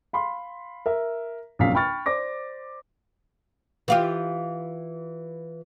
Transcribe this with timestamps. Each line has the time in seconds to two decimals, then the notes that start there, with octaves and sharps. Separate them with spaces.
0.13 F5 B5 C6
0.86 A#4 E5
1.59 A#1 F#2 C3 F5 B6
1.75 G5 B5 C#6 F6 A6
2.06 C5 D5 D6 A#6
3.88 E3 F4 G4